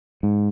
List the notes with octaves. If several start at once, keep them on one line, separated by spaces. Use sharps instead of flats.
G#2